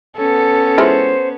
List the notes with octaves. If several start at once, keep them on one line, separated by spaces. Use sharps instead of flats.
B3 C#4 A4
G#3 E4 F4 C5